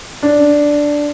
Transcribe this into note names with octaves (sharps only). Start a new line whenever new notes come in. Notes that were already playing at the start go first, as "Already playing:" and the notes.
D4